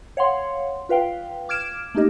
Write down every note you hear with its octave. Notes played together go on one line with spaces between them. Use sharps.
C#5 F5 F#5 C6
F4 B4 F5 G5
D6 F6 G#6 D7 E7
A3 A#3 D#4 G4 D#5